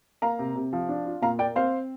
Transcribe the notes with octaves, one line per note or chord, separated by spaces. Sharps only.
A#3 F5 A#5
C3
C3
F3
D4
F4
A#2 F5 A#5
A#3 D5 G5
C4 C5 F5